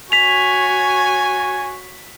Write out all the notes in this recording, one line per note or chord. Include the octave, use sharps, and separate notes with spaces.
F#4 C#5 G#5 B6 F7